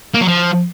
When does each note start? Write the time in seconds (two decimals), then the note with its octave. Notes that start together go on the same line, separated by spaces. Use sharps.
0.14 A#3
0.21 F#3
0.28 F3